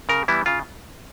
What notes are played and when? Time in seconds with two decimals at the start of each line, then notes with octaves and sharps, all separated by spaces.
0.09 C#3 A#4
0.28 E3 G3 B3 E4
0.46 C#3 F4